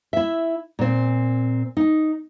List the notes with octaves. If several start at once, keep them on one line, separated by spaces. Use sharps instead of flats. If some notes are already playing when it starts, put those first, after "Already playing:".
E4 E5
A#2 C4
D#4